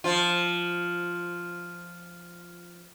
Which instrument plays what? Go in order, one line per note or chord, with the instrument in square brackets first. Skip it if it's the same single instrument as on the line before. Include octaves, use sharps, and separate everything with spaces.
[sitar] F3 F4